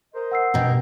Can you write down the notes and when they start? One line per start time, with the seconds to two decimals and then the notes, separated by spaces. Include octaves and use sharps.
0.14 A#4 C5 D#5
0.31 F#5 E6 C7
0.54 G2 B2 A#4 G5